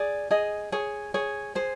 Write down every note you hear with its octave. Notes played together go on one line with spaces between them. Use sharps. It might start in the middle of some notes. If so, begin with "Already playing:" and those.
Already playing: G#4 D5
G#4 D#5
G#4 C#5
G#4 C#5
G#4 C5